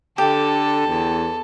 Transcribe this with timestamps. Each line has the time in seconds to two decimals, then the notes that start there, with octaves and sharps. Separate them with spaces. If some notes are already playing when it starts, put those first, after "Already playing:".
0.18 D3 G4 A4
0.86 E2